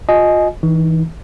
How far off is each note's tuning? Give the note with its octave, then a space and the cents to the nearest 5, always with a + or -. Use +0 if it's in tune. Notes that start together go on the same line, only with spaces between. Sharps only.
F4 +30 D#5 +0 G#5 +20
E3 -25 D#4 +0